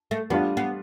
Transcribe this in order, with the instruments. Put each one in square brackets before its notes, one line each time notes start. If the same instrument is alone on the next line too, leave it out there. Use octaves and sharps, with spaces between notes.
[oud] A3
[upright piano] G3 D4 F4 [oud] B3
[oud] B3